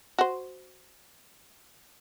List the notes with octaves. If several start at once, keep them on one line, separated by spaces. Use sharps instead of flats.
F#4 C5